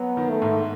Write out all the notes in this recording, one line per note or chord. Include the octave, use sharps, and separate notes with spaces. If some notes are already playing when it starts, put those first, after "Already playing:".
Already playing: F#3 B3
D#3
A3
G#2